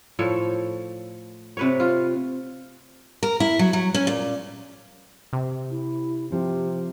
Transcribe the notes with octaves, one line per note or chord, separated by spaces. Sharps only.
A2 F3 A4 C#5
C3 B4 C#5
F4
A#4
E4
F#3
F#3
C#4
A#2
C3
E4
C3 F3 G4